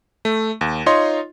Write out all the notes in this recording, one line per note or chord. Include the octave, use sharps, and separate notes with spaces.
A3
D#2
D#4 F4 C#5 D#5 C6